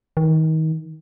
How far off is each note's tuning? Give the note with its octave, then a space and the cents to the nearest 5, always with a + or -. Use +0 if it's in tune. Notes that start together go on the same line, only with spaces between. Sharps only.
D#3 +30